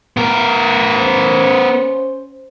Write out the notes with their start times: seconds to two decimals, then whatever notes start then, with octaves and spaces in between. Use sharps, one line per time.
0.17 B3 A#4
0.97 C#4 C5